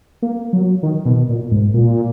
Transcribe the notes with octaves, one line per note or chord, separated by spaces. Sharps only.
A#3
F#3
D#3
B2
A#2
G#2
A#2